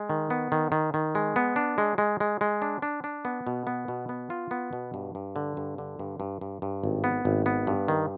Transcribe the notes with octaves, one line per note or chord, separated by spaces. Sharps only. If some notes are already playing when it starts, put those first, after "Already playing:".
Already playing: G#3
D#3
B3
D#3
D#3
D#3
G#3
B3
D4
G#3
G#3
G#3
G#3
D4
D4
D4
B3
B2
B3
B2
B3
F4
B3
B2
G2
G2
D3
G2
D3
G2
G2
G2
G2
G#1
B3
G#1
B3
G2
D#3